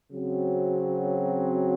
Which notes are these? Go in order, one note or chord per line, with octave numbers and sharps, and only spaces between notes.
C#3 F#3 C4 F#4